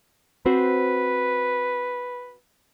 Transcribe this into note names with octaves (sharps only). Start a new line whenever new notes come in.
C4 F#4 B4 C5